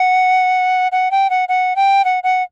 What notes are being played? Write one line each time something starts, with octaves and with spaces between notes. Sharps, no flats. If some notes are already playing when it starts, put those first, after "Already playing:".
Already playing: F#5
F#5
G5
F#5
F#5
G5
F#5
F#5